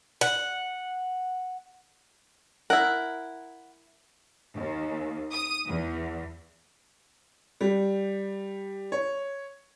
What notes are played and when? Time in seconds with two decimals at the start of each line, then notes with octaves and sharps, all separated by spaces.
0.21 F#5
2.70 E4 A#4 F#5
4.55 D#2
5.31 D#6
5.67 E2
7.61 G3
8.92 C#5